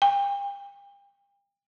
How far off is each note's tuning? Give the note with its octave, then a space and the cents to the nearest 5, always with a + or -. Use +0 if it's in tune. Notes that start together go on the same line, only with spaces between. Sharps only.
G5 +40